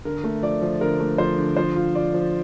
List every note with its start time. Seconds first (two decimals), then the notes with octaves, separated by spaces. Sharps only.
0.05 D3 A#4
0.24 A3
0.42 F3 D5
0.62 F3
0.81 D3 A#4
1.00 A3
1.18 F3 C5
1.38 D3
1.57 F3 C5
1.76 F4
1.95 F4 D5
2.14 F3